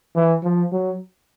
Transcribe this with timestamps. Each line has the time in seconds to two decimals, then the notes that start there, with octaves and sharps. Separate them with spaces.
0.15 E3
0.43 F3
0.72 F#3